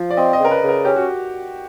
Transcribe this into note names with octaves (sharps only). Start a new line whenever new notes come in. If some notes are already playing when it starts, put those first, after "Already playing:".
Already playing: F3
D5
C4 D#5
D#5
C#3
A#4
B4
C#3
A#4
C#4 G4
F#4